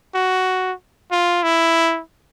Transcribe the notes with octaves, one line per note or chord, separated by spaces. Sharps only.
F#4
F4
E4